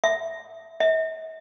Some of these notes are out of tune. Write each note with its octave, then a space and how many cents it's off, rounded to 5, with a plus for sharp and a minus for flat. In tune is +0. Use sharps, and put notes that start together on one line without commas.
E5 +0
E5 -45